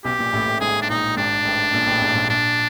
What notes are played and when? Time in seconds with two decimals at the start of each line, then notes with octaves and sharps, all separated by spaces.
0.05 B1 B2 G4
0.19 A#1 A#2
0.33 A1 A2
0.46 A1 A2
0.61 G#1 G#2 G#4
0.82 D4
0.89 A#1 A#2 D#4
1.16 G#1 G#2 D4
1.45 A1 A2
1.73 A#1 A#2
1.86 A1 A2
2.01 G#1 G#2
2.15 A#1 A#2
2.29 A#1 A#2 D4